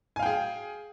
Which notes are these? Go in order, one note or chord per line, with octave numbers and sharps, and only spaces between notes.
G#4 F5 G5 G#5